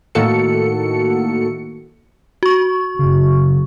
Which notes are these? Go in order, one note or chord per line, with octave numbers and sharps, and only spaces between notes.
A2 D#3 A#3 F#4 A4 C#7
F#4 C#6
F#1 F#2 C#3